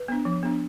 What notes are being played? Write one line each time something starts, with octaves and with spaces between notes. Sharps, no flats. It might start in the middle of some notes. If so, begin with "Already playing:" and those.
Already playing: B4
B3 D4
F3
B3 D4